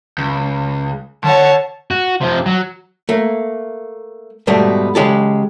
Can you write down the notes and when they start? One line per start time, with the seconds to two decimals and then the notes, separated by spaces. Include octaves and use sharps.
0.18 C#2
1.24 D3 C#5 F#5 A5
1.91 F#4
2.21 C3 F3
2.46 F#3
3.09 A3 A#3
4.47 G#2 B2 G3 A3 B3
4.95 C#3 G#3 G4 A4